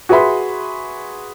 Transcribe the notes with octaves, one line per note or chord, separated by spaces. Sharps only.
F#4 G#4 B4 E5 B5 C6